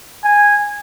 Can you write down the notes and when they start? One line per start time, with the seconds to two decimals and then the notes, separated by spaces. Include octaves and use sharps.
0.24 G#5